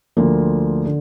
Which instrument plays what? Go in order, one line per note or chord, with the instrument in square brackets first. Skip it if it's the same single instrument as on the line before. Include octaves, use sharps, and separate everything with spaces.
[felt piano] D2 D3 F3 A#3
D3